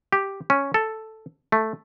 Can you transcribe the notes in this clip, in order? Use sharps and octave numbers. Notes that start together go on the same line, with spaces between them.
G4
C#4
A4
A3